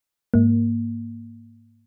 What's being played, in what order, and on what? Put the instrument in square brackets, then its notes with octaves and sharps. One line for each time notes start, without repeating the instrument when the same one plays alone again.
[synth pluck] G#2 A#3